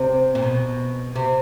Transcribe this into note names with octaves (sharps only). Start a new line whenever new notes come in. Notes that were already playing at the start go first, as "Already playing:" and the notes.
Already playing: C3
A#2
B2
C3